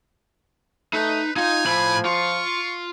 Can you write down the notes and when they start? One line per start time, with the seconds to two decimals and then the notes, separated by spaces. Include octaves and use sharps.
0.93 A3 D#4 B4
1.36 D#4 F4 G#5
1.66 A2 F3 B5
2.05 F4 C#6